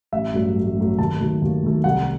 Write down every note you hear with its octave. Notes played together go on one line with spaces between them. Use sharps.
A1 E5
G2 F#3 A3
A1
G2 F#3 A3
D#2 A5
D#3 F#3 A3
D#2
D#3 F#3 A3
C2 F#5